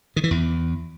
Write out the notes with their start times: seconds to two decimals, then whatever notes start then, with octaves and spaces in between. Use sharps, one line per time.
0.16 D#3
0.24 E3
0.31 E2